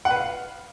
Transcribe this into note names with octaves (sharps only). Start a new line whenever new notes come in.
F#5
B4
F5